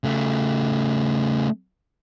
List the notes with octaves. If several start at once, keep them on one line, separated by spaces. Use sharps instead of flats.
C#3 A3